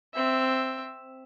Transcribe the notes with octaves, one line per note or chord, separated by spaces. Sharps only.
C4 E5